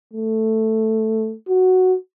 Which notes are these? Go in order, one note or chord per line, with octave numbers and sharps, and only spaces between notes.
A3
F#4